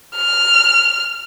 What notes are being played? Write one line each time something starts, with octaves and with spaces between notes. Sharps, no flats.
F6